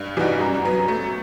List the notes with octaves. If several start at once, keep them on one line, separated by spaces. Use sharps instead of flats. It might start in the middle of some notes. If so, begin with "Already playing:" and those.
Already playing: G2
E3 G3 D#4 F#4
F#2
F#3 B3
A3